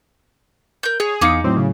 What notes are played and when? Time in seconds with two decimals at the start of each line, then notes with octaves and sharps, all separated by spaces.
0.83 A#4 G6
1.00 G#4 C#5
1.21 E2 D#4 F5 D6 C#7
1.44 A2 F#3 C4
1.57 C#3